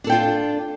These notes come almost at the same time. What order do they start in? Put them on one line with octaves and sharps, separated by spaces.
D4 A4 G5 F4